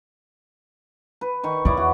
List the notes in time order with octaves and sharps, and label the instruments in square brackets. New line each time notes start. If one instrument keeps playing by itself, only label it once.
[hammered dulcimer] B4
D#3 C#6
[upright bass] E2 [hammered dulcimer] E4 C#5 D5
[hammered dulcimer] F#4